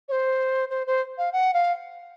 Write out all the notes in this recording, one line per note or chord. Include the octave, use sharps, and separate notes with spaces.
C#5
C5
C5
C5
F5
F#5
F5